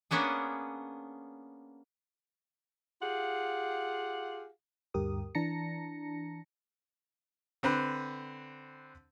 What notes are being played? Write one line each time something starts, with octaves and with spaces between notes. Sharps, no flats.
A#3 B3 C#4 D4 G#4
F4 G4 G#4 F5 F#5
D2 G2 G4 A#4 D#6
E3 D4 A5 A#5 A#6 C#7
D3 C4 B4 F#6